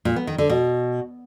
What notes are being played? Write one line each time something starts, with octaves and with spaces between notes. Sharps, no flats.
A#2
B3
D#3
D3
B2